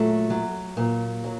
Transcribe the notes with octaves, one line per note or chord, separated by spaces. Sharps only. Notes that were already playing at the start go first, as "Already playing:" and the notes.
Already playing: A#2 F#3 A3
F#3
A#2
F#3